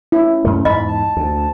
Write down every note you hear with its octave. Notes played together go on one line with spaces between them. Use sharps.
C#4 E4
F#2 A3
E2 G#2 D#5 B5
A5
D2